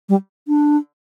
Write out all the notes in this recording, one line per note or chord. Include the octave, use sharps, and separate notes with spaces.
G3
D4